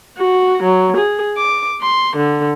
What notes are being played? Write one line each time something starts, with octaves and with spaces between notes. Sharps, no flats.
F#4
F#3
G#4
D6
C6
D3